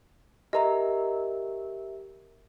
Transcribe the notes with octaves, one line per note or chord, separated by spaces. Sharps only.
G4 A#4 D#5 E5 A#5